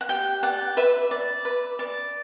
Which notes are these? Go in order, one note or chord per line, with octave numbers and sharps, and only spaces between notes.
F#5
G4 G5
D5 F#5
B4 E5
D5
B4
D5